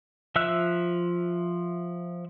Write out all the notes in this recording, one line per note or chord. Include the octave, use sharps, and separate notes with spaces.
F3 E5 E6 F#6